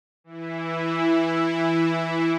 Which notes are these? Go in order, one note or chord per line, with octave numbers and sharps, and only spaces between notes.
E3 E4